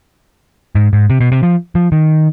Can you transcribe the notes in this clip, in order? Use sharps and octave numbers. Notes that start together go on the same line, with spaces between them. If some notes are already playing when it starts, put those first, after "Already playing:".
G#2
G#2
C3
B2
C3
F3
F3
D#3